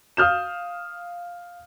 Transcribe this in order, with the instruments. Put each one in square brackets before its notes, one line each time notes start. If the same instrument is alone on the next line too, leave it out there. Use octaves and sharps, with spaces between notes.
[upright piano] F5 D#6 F6 G6 E7